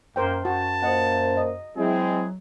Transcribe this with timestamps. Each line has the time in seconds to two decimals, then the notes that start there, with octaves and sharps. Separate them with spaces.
0.16 F#2 A#3 A#4 C5 G5
0.45 F#2 F#4 A5
0.82 A#2 A#3 C5 D#5 F#5
1.37 D#5
1.76 F#3 G#3 C4 E4 G#4